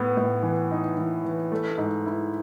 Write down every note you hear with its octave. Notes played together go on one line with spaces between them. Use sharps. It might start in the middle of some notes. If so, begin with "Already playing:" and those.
Already playing: A2 B3
A2
E3
D#4
E3
E3
A3
G#2
E4